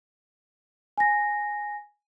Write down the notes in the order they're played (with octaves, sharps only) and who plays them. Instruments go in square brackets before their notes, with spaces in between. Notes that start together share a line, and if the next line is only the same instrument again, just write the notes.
[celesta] G#5 A#6